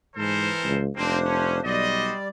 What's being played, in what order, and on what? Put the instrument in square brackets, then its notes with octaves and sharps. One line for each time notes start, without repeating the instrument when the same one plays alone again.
[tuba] G#2 [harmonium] E3 [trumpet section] A4 A#4 C5
[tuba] C#2
[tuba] F1 [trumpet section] A#3 C4 [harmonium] D4 C5
[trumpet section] C#4
[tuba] B1 [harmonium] G3 D5 [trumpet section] F#4 C5 D#5